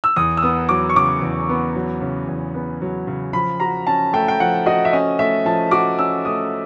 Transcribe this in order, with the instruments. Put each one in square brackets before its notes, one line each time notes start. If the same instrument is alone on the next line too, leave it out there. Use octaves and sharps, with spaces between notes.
[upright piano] E6
[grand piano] E2 [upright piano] D#6
[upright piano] E6
[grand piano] B3 [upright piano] D#6
[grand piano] F#3 [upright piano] D6
[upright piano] C#6
[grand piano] C#3 [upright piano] D6
[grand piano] E2
B3
F#3
C#3
E2
B3
F#3
C#3
[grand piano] F3 [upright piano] B5
[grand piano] F#4 [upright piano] A#5
[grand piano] C#4 [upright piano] A5
[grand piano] A3 [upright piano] G5
[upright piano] G5
[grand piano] F3 [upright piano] F#5
[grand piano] F#4 [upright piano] D#5
[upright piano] E5
[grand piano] C#4 [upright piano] D#5
[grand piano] A3 [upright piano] E5
[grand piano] F3 [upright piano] A5
[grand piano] F#4 [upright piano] D6
[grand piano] C#4 [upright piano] E6
[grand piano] A3 [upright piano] D#6